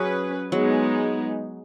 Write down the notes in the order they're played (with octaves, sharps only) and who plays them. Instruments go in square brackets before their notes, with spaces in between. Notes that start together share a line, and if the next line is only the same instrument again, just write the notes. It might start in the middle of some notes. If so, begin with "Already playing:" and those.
Already playing: [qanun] F#3 [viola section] C#4 G#4 B4
[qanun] F#3 [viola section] G#3 B3 D#4 G#4